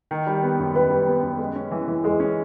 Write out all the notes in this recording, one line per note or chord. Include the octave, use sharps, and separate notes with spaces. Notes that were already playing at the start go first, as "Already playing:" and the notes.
D#3
G3
B3
F#2
D#3 B4
G3
B3
F#2
G#3
C#4
E3
E3
G#3 G#4
C#4